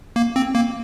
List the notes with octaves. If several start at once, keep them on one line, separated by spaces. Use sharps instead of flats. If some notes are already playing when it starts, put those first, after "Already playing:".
A#3
C4
A#3